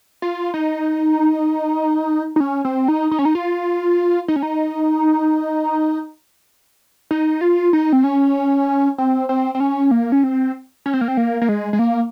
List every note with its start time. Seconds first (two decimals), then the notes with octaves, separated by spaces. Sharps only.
0.22 F4
0.54 D#4
2.36 D#4
2.40 C#4
2.65 C4
2.88 D#4
3.11 D#4
3.19 C#4
3.25 D#4
3.35 F4
4.28 D#4
4.36 C#4
4.43 D#4
7.11 D#4
7.41 F4
7.73 D#4
7.93 C4
8.04 C#4
8.98 C4
9.29 C4
9.55 C4
9.60 C#4
9.91 A#3
10.12 C#4
10.24 C4
10.86 C#4
10.94 C4
11.01 A#3
11.08 C4
11.17 A#3
11.42 A#3
11.49 G#3
11.73 G#3
11.79 A#3